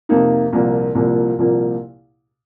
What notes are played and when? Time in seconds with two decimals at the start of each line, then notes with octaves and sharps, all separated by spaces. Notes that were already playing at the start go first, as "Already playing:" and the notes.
0.09 F2 C3 F3 A#3 D#4
0.53 C2 A#2 F3 A#3
0.95 C2 A#2 F3 A#3
1.39 C2 A#2 F3 A#3